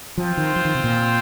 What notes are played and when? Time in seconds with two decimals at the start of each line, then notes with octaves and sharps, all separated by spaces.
0.18 F3 C4 F4 C5 G5
0.37 D#3
0.56 F3
0.65 D#3
0.75 C3
0.84 A#2